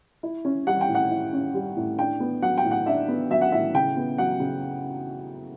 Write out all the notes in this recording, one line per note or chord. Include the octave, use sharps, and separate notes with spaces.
E4
C#4
G3 F#5
G5
A2
F#5
E4
C#4
G3
A2
D4 G5
B3
F#3 F#5
G5
A2
F#5
D4 E5
B3
F#3 E5
F#5
A2 E5
C#3 G5
B3
F#3 F#5
C#3